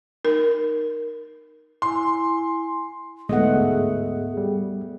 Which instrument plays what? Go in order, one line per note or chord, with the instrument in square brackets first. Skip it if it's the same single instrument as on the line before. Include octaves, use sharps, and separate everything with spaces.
[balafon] D#4 A#4
[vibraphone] E4 G#5 [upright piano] C6
[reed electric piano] D2 G#2 D#5 [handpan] A3 B3 F#5 [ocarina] G#4
[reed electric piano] G3